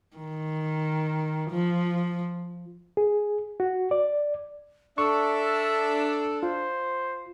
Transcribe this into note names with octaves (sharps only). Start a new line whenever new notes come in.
D#3
F3
G#4
F#4
D5
D4 A4 E5 C#6
F4 C5